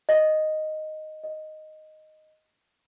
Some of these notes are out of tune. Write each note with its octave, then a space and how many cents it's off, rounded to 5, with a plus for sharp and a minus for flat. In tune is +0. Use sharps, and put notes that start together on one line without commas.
D#5 -5
D#5 -5